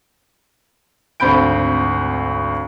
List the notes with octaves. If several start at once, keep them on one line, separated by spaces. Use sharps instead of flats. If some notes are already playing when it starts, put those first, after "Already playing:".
G#1 D2 C4 B5 G6 D7